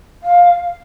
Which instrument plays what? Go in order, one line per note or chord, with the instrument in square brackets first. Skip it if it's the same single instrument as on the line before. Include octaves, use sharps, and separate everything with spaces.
[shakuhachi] F5